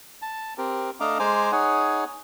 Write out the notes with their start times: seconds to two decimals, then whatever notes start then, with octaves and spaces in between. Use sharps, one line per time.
0.22 A5
0.58 C4 G4 A#4
1.00 A3 D4 D#5 F5 A#5 D6
1.19 G#3 C5 G#5 A#5 D6
1.52 D#4 G#4 C#5 F#5 G#5